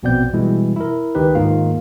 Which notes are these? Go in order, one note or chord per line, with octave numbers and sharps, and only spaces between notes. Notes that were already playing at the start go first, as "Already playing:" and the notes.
A#1 B2 B3 C4 D5 G6
B2 E3 G3 G#3 E4
E4 A#4
C#2 D#3 D#4 G4 B4
G#2 D#3 A#3 F4 F5